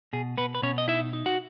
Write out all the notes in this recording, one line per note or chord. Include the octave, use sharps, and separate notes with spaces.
B2 G#4
B2 B3 B4
B4
B2 C#4 C#5
D#5
D#4 E4 E5
D#4
F#4 F#5